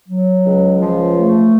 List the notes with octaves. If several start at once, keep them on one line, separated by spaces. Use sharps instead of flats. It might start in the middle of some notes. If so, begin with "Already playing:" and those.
F#3
C#2
F3
A3